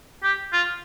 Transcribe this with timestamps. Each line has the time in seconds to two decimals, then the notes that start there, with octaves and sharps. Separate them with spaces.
0.23 G4
0.53 F4